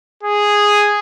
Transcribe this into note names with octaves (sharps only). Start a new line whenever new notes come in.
G#4